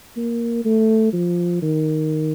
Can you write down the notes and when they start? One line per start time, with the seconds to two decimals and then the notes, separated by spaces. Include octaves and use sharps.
0.17 A#3
0.65 A3
1.13 F3
1.62 D#3